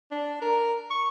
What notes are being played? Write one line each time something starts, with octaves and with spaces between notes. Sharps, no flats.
D4
A#4
C#6